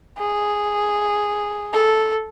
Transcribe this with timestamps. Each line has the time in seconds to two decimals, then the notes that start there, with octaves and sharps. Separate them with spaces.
0.18 G#4
1.73 A4